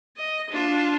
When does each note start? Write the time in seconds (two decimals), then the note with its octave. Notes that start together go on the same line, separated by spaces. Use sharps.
0.17 D#5
0.50 D4 F4